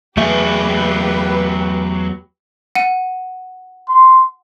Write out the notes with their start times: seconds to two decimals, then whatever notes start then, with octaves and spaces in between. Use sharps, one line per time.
0.17 E2 F#3 A3 G4 G#4 B4 E5
2.75 F#5 D#7
3.89 C6